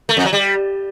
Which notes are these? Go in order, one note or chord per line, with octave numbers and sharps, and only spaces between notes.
A3
F2
F#3
G3